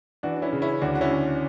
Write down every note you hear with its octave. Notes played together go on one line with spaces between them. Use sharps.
E3 D4 F#4
D4
C#4 E4
C#3
C#4 E4
D2 D4 F#4
F#4
C#4 E4
D2